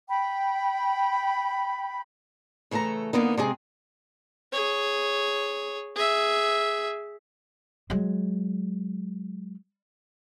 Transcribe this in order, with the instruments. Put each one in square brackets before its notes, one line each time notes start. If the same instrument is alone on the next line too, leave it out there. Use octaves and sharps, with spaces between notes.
[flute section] G5 B5
[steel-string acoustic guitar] C#3 E3 A3 A4 A#5
D3 A#3 B3 D#4
C3 G#3 C4 G#4
[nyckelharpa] G#4 C#5
G#4 E5
[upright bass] F#3 G#3